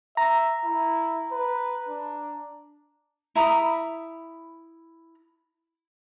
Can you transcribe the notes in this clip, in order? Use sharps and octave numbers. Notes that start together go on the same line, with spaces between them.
E5 A#5
E4
B4
D4
E4 A#5 B5 D#6